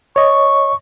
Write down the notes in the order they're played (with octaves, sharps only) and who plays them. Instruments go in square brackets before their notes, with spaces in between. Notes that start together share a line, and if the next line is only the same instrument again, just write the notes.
[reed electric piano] C#5 D#5 [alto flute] C#6